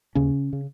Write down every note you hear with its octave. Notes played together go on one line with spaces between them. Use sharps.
D#2 C#3 C#4
C#3